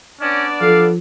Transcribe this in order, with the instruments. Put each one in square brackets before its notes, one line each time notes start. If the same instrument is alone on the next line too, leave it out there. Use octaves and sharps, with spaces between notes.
[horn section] B3 D4 D5 [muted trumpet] C#4
[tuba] F3 [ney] A4 [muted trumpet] F5